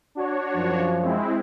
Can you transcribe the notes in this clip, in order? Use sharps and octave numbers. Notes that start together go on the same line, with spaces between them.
D4 F#4 C#5
F#2 F3
G#3 C4 E4